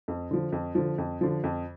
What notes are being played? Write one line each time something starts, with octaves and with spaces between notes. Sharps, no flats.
F2
D3 F3
F2
D3 F3
F2
D3 F3
F2